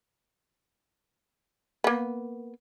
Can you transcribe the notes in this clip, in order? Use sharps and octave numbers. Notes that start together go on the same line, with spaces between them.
A#3 B3